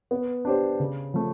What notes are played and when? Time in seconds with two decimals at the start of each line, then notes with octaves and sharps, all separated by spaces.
0.11 B3
0.45 D4 G4 C5
0.80 C#3
1.14 F3 A3